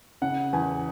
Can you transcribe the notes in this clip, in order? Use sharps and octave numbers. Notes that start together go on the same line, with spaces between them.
C#3 F#5
E2 G#5